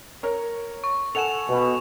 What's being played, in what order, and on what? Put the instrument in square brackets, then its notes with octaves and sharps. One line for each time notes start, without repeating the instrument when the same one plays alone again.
[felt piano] A#4 C#5
[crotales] C#6
[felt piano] A4 F#5 G#5 [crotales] E7 F7
[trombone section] B2